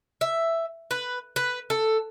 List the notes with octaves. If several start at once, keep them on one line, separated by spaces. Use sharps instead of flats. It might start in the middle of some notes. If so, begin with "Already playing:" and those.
E5
B4
B4
A4